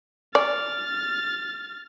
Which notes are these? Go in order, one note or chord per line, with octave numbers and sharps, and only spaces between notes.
D5 F6 A6